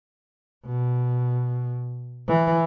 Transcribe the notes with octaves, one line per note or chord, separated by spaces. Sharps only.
B2
E3